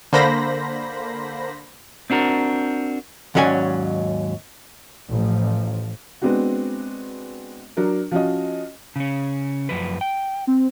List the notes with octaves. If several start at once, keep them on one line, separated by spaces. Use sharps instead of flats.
D3 A#3 C5 B5 A#6
C4 D4 F#4 A#4
D#2 G#2 F#3 C#4 D5 G#5
A1 F3
G#3 B3 C4 D4 F#4
F#3 D4 A#4
F3 C#4 F#4 D#5
C#3 C#4
F#2 F3 B4
G5
C4